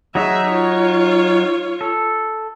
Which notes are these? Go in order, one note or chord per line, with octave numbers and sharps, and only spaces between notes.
F#3 D#4 F#4 G#4 E5
F4 C#5
A4